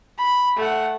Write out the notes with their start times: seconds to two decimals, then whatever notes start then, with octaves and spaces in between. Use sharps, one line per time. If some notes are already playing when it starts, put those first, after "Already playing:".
0.18 B5
0.57 A3 F#5